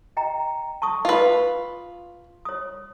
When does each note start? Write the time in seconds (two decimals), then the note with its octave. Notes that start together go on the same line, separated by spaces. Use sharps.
0.17 D#5 G5 A#5
0.82 A5 C#6 D#6
1.05 F4 B4
2.45 C#5 D#6